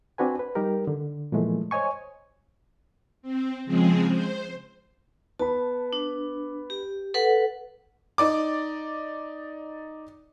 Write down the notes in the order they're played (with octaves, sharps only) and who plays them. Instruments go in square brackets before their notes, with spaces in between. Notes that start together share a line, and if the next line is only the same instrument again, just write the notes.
[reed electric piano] C4 D4 F#4 B4 G#5
B4
G3 D#4 G4 A#4
D3
A#2 E3 F3 G#3 A3
C5 C#5 D#5 G#5 C#6
[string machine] C4
C#3 F3 G#3 C4 G#4
C5
[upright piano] B3 B5 [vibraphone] A5
[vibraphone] D4
G4
A4 B4 F#5
[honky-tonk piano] D#4 D5 D6